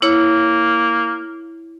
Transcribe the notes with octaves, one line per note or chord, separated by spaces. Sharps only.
A#3 E4 C#5